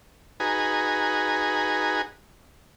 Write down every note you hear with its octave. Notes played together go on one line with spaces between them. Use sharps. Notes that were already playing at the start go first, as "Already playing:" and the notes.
D#4 F#4 G#4 B4 G#5 A#5